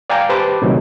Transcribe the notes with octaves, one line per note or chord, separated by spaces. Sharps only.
D5 F5 G5 G#5 A#5 D6
G4 B4 C5 A5 D6
A2 C3 D#3 F#3